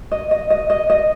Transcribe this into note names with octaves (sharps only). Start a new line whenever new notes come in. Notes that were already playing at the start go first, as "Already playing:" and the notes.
D#5
D#5
D#5
D#5
D#5